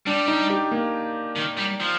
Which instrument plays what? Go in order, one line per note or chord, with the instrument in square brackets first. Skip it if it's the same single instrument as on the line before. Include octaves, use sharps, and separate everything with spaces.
[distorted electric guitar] G3 [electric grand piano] D4
[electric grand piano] D#4
G4
A#3
[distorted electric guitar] D#3
G3
F3